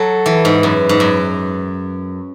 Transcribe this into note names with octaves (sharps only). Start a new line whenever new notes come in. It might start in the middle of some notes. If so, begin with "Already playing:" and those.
Already playing: F#3 A4
E3
G#2
F#2 B4
G#2
F#2